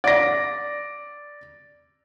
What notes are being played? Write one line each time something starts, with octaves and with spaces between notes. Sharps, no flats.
D5 A#6